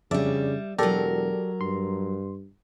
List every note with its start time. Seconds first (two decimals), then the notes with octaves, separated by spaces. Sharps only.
0.11 F2 C#3 G3 D4 D5 E5
0.78 E1 F#3 G4 A4 A#4 D5
1.61 G2 C6